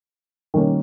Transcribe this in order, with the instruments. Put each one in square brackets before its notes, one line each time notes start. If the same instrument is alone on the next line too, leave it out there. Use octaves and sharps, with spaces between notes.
[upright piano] D#3 G3 A#3 C#4